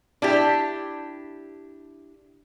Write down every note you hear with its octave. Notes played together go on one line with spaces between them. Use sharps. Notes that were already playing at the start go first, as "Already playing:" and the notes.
D4 E4 G4